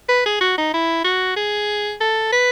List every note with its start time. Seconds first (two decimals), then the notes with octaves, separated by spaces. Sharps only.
0.09 B4
0.26 G#4
0.41 F#4
0.58 D#4
0.74 E4
1.04 F#4
1.37 G#4
2.01 A4
2.33 B4